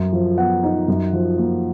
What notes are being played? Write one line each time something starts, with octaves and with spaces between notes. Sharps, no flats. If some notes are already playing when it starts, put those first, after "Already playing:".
Already playing: F#2
F3
B3 F#5
D#4
F#2
F3
A#3